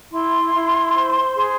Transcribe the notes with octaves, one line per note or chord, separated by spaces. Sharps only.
E4 C6
E4
C5
G#4